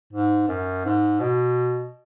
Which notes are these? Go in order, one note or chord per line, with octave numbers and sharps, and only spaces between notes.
G#2
F#2
G#2
B2